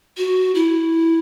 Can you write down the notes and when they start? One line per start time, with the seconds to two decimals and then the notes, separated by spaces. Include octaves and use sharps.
0.17 F#4
0.55 E4